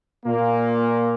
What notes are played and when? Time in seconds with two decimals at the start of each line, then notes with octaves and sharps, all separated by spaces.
0.25 A#2 A#3